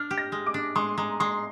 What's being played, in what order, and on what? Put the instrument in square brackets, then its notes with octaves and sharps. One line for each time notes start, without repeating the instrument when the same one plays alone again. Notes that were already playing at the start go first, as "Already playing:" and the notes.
Already playing: [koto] D4 [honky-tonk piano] F6
[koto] G4
[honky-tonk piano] A#6
[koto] G#3
[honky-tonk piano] D6
[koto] D4
[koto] G#3 [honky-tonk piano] C6
[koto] G#3 [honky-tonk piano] A#5
[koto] G#3 [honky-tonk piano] C6